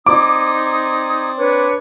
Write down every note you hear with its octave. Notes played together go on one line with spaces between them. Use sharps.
C4 D#4 D5 D6 D#6 G#6
D4 B4 C#5